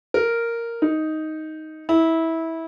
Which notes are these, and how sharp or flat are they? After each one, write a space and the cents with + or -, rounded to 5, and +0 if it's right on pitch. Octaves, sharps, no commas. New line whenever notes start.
A#4 -5
D#4 +5
E4 -20